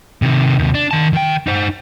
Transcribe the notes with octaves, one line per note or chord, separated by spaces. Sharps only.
C3 D#3
D#2 C3
D4
D#3 A5
D#3 G5
D#4 C5